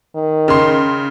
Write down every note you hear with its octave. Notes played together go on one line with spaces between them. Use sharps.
D#3
C#3 C6